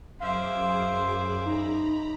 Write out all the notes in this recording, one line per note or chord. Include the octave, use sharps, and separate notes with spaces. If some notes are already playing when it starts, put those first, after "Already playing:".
F#2 G#4 C5 E5 F5 D6
D#4 A#5 B5